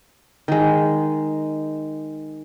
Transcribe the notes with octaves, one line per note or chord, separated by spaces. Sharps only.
D#3 G#3